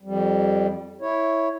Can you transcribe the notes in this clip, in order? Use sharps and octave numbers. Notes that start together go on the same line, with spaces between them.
F2 G3
E4 C#5